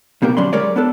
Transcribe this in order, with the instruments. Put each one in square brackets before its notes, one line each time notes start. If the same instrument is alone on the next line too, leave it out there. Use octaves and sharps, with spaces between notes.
[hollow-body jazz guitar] B1 B2 A#3 G4 A#4
D3 F#3 C#4 D5 B5 C6
G3 G#3 A#4 C#5 D5
B3 D4 A4